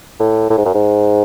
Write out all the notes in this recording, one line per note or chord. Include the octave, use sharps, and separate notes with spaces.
A2
A2
G#2
F#2
G#2